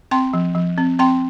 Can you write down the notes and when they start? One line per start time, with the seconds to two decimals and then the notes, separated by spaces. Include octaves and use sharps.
0.11 C4 G5 C6
0.33 F3
0.55 F3
0.78 C4
0.99 C4 G5 C6